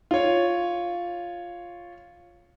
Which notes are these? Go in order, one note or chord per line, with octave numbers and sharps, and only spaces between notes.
F4 C#5